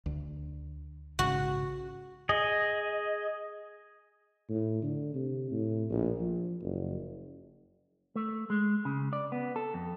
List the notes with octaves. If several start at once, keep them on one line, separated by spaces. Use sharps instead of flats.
D2
A#1 G#2 C#3 F#4
G#4 D#5
A2
D3
C3
A2
A#1
F3
F#1
A3
G#3
C#3
D5
B3
A4
F2